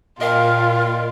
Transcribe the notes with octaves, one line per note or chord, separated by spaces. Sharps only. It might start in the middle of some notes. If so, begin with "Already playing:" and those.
A#2 F4 A#4 D#5 F5 G5